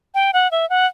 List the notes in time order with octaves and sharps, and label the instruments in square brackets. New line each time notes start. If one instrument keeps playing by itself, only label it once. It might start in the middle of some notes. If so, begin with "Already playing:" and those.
[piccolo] G5
F#5
E5
F#5